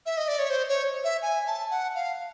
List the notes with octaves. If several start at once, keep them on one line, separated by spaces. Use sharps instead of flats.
E5
D#5
D5
C#5
C5
C#5
E5
G#5
A5
F#5
F5